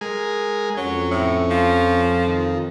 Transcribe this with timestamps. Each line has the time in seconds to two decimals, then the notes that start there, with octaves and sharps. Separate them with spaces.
0.01 G#3 G#4 A#4
0.77 F2 F#3 C#4
1.11 A2
1.50 F3
2.27 D#3